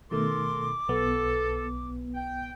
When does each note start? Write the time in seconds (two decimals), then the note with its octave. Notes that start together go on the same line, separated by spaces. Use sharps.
0.11 B2 D#3 A3 A4 A#4 C6 D6
0.89 B1 B3 A4
2.14 G5